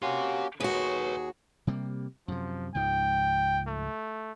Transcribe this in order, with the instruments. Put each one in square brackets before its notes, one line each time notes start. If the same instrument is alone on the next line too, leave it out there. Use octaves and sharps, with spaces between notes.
[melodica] A#3 C#4 F#4 [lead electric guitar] G4 C6
[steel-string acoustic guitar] D#2 F#4 [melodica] G#4 [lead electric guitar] B4 C#5
[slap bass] C3 G3 A#3
[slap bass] F#2 C3 [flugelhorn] F3
[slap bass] C#2 G#2 F3 [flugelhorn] G5
[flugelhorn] A3